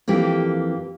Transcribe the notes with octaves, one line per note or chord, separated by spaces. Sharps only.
F2 E3 A#3 G4